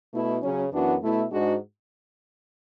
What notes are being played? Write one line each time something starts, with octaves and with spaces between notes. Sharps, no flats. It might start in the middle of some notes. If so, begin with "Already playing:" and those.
B2 A3 E4
C#3 F#3 C#4
F#2 E3 B3 D4 F#4
B2 A3 E4
G#2 G#3 D4 F#4